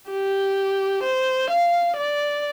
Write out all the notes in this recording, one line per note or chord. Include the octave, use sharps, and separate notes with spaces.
G4
C5
F5
D5